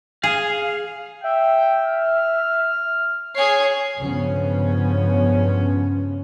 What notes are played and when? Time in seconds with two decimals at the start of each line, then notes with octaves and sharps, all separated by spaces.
0.23 G#4 F5
1.24 E5 G5
1.85 F6
3.35 G#4 C#5 C7
3.98 G2 C#3 F3 B3 C#4